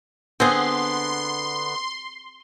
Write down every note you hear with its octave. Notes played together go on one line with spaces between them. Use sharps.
D3 B3 C4 G#4 C6